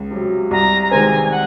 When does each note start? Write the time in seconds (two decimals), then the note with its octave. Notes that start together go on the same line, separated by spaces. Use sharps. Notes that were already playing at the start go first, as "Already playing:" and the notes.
Already playing: C#2
0.11 C3 F#3
0.51 C2 A#5
0.82 A#5
0.91 C3 D#3 G#3 C4 G#5
1.24 G#5
1.31 F#5